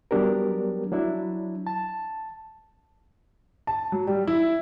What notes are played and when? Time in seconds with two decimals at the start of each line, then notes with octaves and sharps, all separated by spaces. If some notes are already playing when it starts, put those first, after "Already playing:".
0.11 F#3 G3 B3 D4 G4 A#4
0.91 F#3 D4 E4
1.67 A5
3.67 A5
3.92 F#3
4.07 G3
4.27 E4